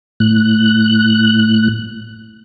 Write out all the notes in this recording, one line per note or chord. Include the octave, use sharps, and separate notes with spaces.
A2 F#6